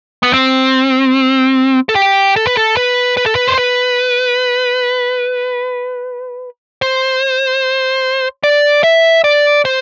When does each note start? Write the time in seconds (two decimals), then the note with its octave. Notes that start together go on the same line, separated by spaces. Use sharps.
0.23 B3
0.33 C4
1.89 A4
1.95 G4
2.36 A4
2.47 B4
2.57 A4
2.77 B4
3.17 B4
3.26 A4
3.35 B4
3.47 C5
3.58 B4
6.82 C5
8.44 D5
8.84 E5
9.24 D5
9.65 C5